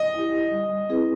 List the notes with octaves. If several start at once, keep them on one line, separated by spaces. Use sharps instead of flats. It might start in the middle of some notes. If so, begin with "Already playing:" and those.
Already playing: D#5
E4 G4
G3
C4 E4 G#4 B4